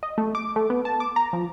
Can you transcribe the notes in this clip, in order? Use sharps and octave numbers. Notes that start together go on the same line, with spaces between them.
D#5
A3
D6
A3
B3
A5
D6
A#5
F3